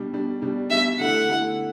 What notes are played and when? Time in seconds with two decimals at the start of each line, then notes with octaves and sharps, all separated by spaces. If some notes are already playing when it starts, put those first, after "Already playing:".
Already playing: B2 G3 D4
0.12 B2 G3 D4
0.42 B2 G3 D4
0.70 B2 G3 D4 E5
0.99 D3 A3 E4 F#5
1.29 D3 A3 E4